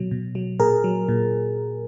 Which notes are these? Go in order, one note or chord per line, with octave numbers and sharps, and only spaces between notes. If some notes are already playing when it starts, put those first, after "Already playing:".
Already playing: B2 F#3
B2
F#3
A#2 G#4 A#4
F#3
A#2